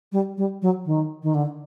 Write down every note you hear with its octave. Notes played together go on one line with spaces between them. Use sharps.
G3
G3
F#3
D#3
D#3
D3